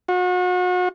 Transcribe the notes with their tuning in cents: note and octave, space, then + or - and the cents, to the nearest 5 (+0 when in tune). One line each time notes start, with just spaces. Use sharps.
F#4 -35